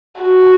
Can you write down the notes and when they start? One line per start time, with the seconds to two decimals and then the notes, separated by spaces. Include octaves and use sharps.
0.21 F#4